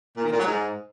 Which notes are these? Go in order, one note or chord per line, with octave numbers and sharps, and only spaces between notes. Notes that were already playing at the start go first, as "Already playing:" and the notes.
A#2
D#3
A#2
F#3
G#2